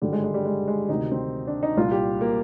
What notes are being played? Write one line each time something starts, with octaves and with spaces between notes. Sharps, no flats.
G#1 G2 D3 G3
G#3
G#3
G3
G#3
G#3
D2 C3 D#3 D#4
C4
D4
D#4
C2 A#2 F4
G4
A#3